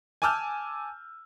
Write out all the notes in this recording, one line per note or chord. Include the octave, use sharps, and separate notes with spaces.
G#5 A5 D6 E6 F6 G6